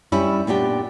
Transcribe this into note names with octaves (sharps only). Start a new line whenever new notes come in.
G3 C#4 E4
A#2 B3 D4 G4